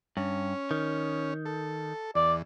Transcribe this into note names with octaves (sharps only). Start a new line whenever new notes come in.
G2 C#4
D#3
A4
E2 D5